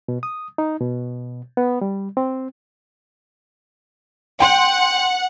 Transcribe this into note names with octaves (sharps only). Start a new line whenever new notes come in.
B2
D#6
D#4
B2
B3
G3
C4
F#5 G5 C6